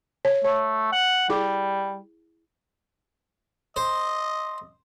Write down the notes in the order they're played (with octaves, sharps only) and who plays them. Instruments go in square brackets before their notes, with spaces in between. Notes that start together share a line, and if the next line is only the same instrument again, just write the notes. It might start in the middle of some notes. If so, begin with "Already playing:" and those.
[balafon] C#5
[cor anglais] A3 [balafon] C#5
[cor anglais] F#5
[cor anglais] G3 [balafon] E4 G#4 D6
[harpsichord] C5 [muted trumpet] D#5